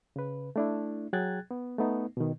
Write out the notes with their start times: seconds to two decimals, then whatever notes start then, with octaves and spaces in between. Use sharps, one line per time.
0.16 C#3 B4
0.56 A3 D4 E4
1.13 F#3 G#4 G5 F#6 G#6 A6
1.51 B3
1.79 A3 B3 D#4
2.17 B2 D#3